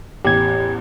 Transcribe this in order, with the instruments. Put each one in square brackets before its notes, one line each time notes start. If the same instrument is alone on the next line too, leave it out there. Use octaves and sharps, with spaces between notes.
[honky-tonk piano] A1 E2 [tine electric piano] G4 G#6